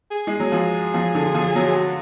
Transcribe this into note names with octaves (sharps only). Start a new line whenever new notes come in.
G#4
G#3
F#3
F3
F3
D3
F3
F#3
F#4